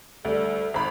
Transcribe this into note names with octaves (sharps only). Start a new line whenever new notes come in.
D2 G3 A4
G#1 B5